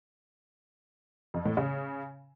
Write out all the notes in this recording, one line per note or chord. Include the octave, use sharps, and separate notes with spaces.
F2
A2
C#3